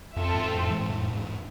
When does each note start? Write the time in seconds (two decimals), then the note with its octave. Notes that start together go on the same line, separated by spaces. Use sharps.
0.16 F2 C4 F4 A4 E5
0.34 E2 G#2
0.53 F2 A2
0.70 E3 G#3
0.80 G#2
0.89 F2 A2
1.13 E2 G#2